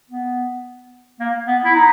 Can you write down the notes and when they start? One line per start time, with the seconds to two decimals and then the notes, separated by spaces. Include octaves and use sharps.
0.10 B3
1.20 A#3
1.47 B3
1.65 E4
1.75 D#4